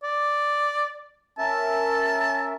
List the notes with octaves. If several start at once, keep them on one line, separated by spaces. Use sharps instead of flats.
D5
C#4 A#4 E5 A5